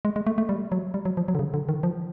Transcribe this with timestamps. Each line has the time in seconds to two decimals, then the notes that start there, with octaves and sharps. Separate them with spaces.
0.05 G#3
0.16 G#3
0.27 A3
0.38 A3
0.49 G3
0.72 F#3
0.94 G3
1.05 F#3
1.17 F3
1.28 F#3
1.35 D3
1.39 C#3
1.54 D3
1.69 D#3
1.83 F3